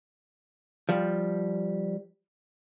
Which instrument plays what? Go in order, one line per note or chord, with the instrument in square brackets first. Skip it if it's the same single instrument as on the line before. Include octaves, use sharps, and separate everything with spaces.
[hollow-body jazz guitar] F3 G3